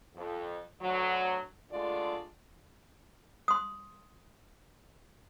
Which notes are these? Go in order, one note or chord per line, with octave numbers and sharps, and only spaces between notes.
F2
D2 F#3
D3 G#3 A3 F4 D5
C6 D#6